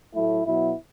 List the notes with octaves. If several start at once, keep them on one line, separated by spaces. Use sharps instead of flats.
A2 F#3 A3 E4
B2 F#3 B3 E4